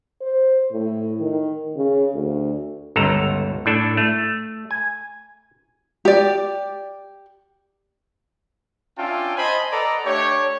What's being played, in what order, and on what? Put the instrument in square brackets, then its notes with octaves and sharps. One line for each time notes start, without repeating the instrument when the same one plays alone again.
[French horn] C5
A2
D#3
C#3
D2
[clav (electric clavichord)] G1 C#2 A4 A#5
A2 D4 A4
A3
G#5
[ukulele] G4 D5
[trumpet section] C#4 D4 F4 E5 G5 A5
C5 D#5 G#5 A5 B5 C6
A4 B4 D5 D#5 F#5 A#5
A3 D4 G4 C#5